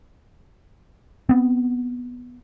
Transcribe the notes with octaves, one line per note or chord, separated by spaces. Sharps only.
B3 C4